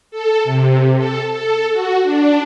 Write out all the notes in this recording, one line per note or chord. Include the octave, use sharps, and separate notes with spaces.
A4
C3
A4
A4
F#4
D4